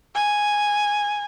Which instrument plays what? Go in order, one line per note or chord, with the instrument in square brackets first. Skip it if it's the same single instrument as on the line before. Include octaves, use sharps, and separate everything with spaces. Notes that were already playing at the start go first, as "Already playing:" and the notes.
[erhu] G#5